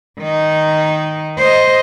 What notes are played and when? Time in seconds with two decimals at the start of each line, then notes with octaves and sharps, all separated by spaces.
0.19 D#3 D#4
1.38 C5 D#5